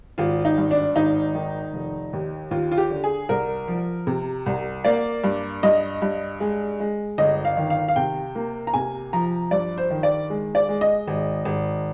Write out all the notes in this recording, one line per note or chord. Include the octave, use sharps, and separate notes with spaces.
G#1 F4
D#4
G2
D4
G#1 D#4
D#3
F1
D#2
D#2 F4
F4
G4
D3
G#4
C2 A#4
F3
C3
C2
A#3 D5
G2
G2 D#5
G2
G#3
G#3
G1 D#5
F5
D#3
F5
F5
C3 G5
A#3
A#5
C3 G#5
F3 A#5
G2 D5
C5
D#3
D5
G#3
D5
G#3
D#5
G#1
G#1